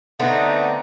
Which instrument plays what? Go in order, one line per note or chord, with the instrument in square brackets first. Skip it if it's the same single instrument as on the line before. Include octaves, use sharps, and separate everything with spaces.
[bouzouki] D3 B3 C4 [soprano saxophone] A3 [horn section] D4 D#4